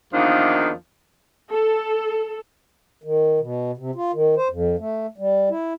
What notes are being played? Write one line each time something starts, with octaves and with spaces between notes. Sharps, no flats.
E2 D#3 F3 A#3 D4 D#4
A4
D#3
B2
C3
F4
D#3
C5
F2
A3
G3
E4